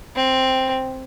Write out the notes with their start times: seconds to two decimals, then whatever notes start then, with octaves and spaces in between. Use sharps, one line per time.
0.16 C4